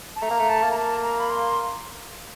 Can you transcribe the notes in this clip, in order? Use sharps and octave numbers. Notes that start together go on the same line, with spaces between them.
A5
A3 A#5
A#3
A3
A5
A#3
A#5
A5
A#5
B5
C6